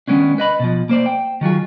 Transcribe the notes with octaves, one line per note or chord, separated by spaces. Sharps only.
D#3 G#3 B3 C#4 D4
B4 D#5 B5
B2 F3
A#3 C5 D5
G5
D#3 F#3 F4 G#4